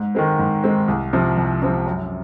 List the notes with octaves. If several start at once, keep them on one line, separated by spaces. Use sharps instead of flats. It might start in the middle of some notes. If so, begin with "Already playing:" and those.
Already playing: G#2
D#3 G#3 C4
G#2
D#3 G#3 C4
C2
C3 F3 C4
C2
C3 F3 C4
F#2